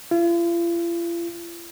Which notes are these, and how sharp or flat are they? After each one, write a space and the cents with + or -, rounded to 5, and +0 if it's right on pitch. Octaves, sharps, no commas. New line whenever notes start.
F4 -45